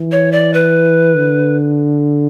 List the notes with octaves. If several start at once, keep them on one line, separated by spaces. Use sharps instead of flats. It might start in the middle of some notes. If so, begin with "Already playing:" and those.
Already playing: E3
C#5
D5
B4
D3